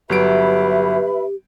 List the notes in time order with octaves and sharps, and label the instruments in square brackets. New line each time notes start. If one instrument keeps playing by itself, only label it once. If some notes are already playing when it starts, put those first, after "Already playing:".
[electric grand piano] G1 F#3 D7 [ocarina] G4 [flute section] B4 E5 B5